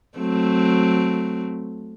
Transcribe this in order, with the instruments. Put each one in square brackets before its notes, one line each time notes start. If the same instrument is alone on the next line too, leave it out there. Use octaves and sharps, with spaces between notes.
[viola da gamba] F#3 A3 C4